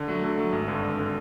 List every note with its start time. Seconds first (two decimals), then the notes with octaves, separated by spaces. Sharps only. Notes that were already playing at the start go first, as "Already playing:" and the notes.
Already playing: D3
0.08 F#3 A3
0.23 D3
0.38 F#3 A3
0.53 G#1
0.68 G2 D3
0.83 G#1
1.00 D3